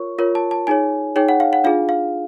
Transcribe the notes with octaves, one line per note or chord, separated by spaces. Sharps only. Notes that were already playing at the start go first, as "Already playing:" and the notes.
Already playing: F4 A#4 C#5 C#6
F4 A#4 C#5
A5
A5
D#4 G#4 C#5 G#5
D#4 G#4 C#5 G5
F#5
F5
F#5
D4 F4 G#4 F5
F5